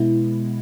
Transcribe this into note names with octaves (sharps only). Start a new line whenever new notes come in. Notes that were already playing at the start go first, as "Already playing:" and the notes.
Already playing: B2 G#3 B3 E4